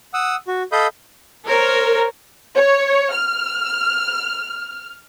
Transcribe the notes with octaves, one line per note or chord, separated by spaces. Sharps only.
F#5 D#6 E6
F#4
A4 D#5 F5 B5 D#6 G6
A#4 C5 C#5
C#5
F6